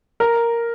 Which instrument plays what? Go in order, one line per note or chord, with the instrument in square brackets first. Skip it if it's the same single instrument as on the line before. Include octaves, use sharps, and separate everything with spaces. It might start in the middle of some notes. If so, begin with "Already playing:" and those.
[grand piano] A#4